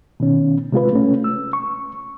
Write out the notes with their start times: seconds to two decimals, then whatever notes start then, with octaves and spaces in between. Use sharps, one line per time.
0.20 B2 D#3 C#4
0.72 C3 G#3 F4 B4
0.93 A3 C#4
1.24 E6
1.53 C#6